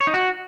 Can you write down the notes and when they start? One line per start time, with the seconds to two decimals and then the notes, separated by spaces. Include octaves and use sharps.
0.01 C#5
0.07 D#4
0.14 F#4